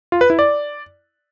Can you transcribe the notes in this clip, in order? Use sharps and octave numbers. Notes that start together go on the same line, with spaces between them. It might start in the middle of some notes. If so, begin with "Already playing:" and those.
F4
B4
E4
D5